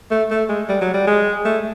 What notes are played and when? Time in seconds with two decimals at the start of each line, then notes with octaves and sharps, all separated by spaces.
0.11 A3
0.30 A3
0.49 G#3
0.69 G3
0.81 F#3
0.94 G3
1.07 G#3
1.45 A3